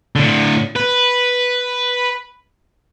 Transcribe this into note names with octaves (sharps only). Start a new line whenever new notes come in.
A2 D3
B4